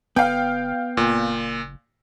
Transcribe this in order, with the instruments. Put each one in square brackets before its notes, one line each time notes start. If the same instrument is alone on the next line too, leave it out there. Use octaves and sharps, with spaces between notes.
[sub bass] G1 [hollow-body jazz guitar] B3 [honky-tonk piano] F5 G5
[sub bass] F#1 [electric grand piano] A#2